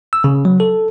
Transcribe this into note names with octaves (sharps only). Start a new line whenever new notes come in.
E6
C#3
F#3
A4